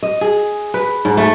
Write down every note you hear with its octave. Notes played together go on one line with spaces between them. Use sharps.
D#5
G#4
B4
G#2
A3